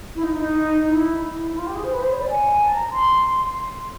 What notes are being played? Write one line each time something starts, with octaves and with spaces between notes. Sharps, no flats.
E4
D#4
D#4
E4
E4
E4
F4
G4
G#4
C5
B4
C5
C#5
D5
G#5
A#5
A5
A#5
C6